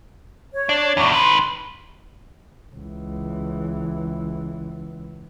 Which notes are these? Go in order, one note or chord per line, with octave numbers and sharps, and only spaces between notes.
C#5
D4
E2 A2 C#6 D6
D#3 B4 C6
C#2 E3